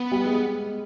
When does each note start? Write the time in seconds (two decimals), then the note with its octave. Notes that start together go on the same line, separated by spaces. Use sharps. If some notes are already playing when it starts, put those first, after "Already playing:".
Already playing: B3
0.12 G3
0.25 G#3